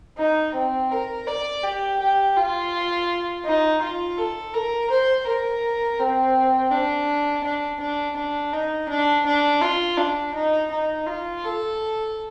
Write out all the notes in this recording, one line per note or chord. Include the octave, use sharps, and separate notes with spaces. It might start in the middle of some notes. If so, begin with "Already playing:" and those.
D#4
C4
A#4
D5
G4
G4
F4
D#4
F4
A4
A#4
C5
A#4
C4
D4
D4
D4
D4
D#4
D4
D4
F4
D4
D#4
D#4
F4
A4